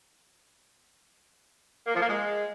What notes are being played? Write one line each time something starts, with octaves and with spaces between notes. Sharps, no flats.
A#3
F3
A#3
G#3